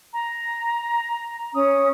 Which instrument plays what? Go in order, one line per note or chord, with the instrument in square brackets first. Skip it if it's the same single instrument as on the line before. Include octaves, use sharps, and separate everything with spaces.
[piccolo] A#5
[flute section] C#4 D#6